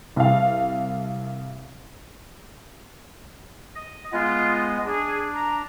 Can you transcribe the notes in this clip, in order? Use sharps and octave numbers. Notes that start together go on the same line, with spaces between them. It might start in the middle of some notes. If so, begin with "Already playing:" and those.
C2 F5
D#5
G#3 B3 F4 D#5
D4 G#4
A#5